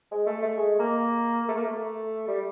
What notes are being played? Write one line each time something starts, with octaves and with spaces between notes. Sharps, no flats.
G#3
A3
A3
G#3
A#3
A3
A#3
A3
G3